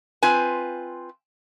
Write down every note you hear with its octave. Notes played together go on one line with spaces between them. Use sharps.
C4 F4 B4 G#5